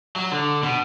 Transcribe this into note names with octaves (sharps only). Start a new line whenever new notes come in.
F#3
D3
B2